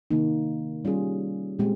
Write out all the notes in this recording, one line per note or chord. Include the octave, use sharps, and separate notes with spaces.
C3 D#3 A#3 D#4
G3 C#4 F4 G#4
A#2 G#3 C4 G4